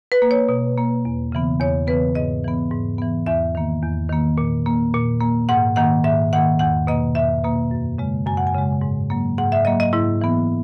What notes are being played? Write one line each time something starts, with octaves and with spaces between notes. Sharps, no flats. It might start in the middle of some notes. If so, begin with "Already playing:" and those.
B4
A#3
C#5
B2
A#3
E2
C#3 E3 B3
E2 C#5
C#3 E3 B3 B4
G#2 D#5
E3 B3
G#2
E3 B3
E2 E5
D#3 A#3
E2
D#3 A#3
A#2
A#3
A#2
A#3
G#2 F#5
D#3 A#3 F#5
G#2 E5
D#3 A#3 F#5
E2 F#5
B2 A#3 D#5
E2 E5
B2 A#3
F#2
C#3 G#3
F#2 G#5
F#5
G#5
C#3 G#3
G#2
F#3 A#3
G#2 F#5
E5
F#3 A#3 D#5
D#5
G#2 E4
E3 B3